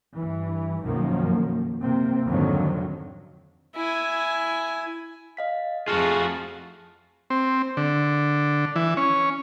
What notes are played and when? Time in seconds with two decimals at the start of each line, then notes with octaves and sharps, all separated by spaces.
0.16 G2 E3
0.82 B1 F#2 D#3 F3 A#3
1.82 C3 A#3 C4
2.27 F2 G#2 D3 D#3 F3 F#3
3.76 E4 G#5
5.37 D#5 F5 B6
5.88 F2 A3 F4 F#4 G#4 F6
7.30 C4
7.77 D3
8.76 E3
8.97 C#4